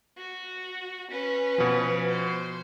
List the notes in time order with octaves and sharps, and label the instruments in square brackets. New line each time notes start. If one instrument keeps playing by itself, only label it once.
[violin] F#4
C#4 B4
[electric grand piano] B2 F3
[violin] C5